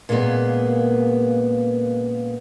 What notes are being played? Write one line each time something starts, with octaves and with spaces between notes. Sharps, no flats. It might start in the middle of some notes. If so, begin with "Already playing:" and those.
A#2 C#3 G#3 A#3 B3